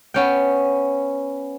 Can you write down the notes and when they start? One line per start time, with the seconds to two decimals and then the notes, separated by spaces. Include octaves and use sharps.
0.14 B3 C#4 G5